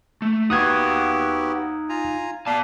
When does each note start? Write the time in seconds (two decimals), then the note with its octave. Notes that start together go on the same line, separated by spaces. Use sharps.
0.22 A3
0.50 B3 D#4 F#4 G4 F5 D#6 F#6 G#6
1.89 F4 G#5 A#5
2.46 B3 D5 F5 A5